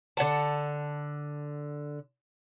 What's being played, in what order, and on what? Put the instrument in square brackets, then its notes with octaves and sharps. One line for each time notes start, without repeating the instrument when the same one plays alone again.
[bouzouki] D3 D5 F#5 A5